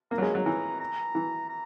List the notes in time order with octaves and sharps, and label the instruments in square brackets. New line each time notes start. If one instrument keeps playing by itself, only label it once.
[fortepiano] A#3 [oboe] A#5
[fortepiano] F#3
[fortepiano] G#3 [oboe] G#5
[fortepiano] F#3 [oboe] A#5
[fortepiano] E3 [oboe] A#5
[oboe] A#5
[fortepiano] E3
[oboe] A#5